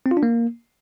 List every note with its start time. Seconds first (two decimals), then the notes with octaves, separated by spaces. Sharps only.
0.06 C4
0.11 F4
0.17 D4
0.23 A#3